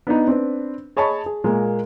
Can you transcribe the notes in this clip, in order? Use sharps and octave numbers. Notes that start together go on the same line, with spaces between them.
B3 D4 D#4
C4 D4 B4
G#4 C#5 D#5 A5 B5 C#6
G#4
A#2 G#3 A#3